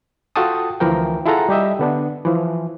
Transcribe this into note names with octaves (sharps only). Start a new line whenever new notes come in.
F4 F#4 A4 G5 A5 D#6
D2 E3 F3 A#4 G5
E4 F4 G#4 A4 F#5 A#5
G3 G4 D#5 E5
D3 B3 D4
E3 F3